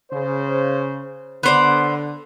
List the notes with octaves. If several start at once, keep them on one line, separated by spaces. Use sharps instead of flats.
C#3 C5
D3 B3 C5 D5